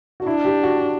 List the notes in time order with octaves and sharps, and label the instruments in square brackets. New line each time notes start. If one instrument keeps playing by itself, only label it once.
[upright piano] F#4
[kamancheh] D4 [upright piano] E4
[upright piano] G4
F#4